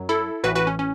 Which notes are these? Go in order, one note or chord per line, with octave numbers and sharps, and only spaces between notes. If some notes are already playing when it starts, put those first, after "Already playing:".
Already playing: F#2 F#3
E4 A4
A1 A2 E3 F#4 B4
F#4 B4
C#4
C#4